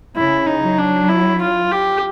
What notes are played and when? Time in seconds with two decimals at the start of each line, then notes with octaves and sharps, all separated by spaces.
0.16 C#3 E4
0.47 D#4
0.62 F#3
0.78 D4
1.09 E4
1.41 F4
1.72 G4